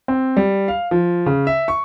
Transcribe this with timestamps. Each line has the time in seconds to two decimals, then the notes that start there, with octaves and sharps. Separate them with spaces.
0.08 C4
0.37 G3
0.68 F5
0.91 F3
1.26 C#3
1.47 E5
1.68 C#6